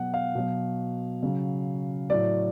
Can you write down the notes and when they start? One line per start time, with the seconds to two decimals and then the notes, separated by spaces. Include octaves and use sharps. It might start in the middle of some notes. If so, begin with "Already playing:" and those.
Already playing: B2 F#3 F#5
0.14 F5
0.35 B2 F#3
1.23 C#3 F#3
2.10 A2 F#3 D5